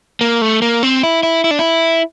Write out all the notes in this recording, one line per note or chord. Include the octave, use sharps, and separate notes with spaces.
A#3
A3
A#3
C4
E4
E4
E4
D4
E4